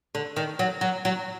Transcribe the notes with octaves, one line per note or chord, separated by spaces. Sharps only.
D3
D#3
F#3
F#3
F#3